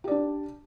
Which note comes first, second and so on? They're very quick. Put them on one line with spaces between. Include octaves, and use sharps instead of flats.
G4 D5 D4